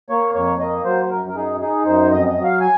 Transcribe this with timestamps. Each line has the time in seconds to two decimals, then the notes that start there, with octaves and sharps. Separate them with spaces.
0.09 A#3 C#5
0.35 F2 C#5
0.60 A#3 D#5
0.85 F#3 C5
1.05 C5
1.10 F#2 A#4
1.29 A#4
1.36 D#4 G#4
1.60 D#4 G#4
1.85 F#2 C5
2.10 F2 D#5
2.28 D#5
2.35 F#3
2.44 F5
2.60 G#5